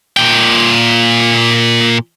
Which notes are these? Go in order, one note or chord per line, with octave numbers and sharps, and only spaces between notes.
A#2 G5